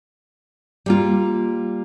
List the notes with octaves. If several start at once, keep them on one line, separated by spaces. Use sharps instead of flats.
G3 A#3 F4